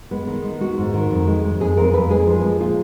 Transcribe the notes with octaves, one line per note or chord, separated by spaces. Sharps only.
G#3 B3
D#3
G#3
G#3 F#4
G#2
D#3
F2
G#3
G#3
F2 G#4
F2 A#4
F2 B4
G#3 G#4
F3
G#3
A#2 F4